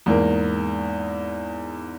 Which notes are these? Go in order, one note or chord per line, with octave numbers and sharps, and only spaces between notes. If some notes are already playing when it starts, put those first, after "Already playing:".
E2 G#2 A#3